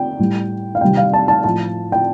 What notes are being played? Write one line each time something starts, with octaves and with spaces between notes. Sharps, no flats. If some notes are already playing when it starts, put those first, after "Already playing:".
Already playing: G5
A2 G3
F5
C3 D#3 G3 G5
F5
A5
A5
A2 F3 A5
G5